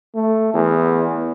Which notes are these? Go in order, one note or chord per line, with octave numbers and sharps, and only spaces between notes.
A3
E2